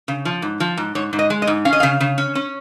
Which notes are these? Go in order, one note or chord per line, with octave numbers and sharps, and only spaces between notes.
C#3
F3
G#2
F3
G#2
G#2 C#5
G#2
D#5
G#3
D#5
G#2
C#4 F5
D#5
C#3 F5
C#3
C#4
C#4